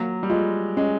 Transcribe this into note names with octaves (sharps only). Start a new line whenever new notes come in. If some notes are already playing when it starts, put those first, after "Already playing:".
Already playing: F#3 A#3
G3
G#3 F4
G#3 C#4